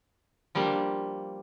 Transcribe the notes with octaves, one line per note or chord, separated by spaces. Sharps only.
F3 G3 A#3 D4